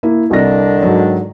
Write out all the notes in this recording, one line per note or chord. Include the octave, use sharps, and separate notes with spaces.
A#3 E4
C2 D3 D#3 D4 A#6
G#2 F#3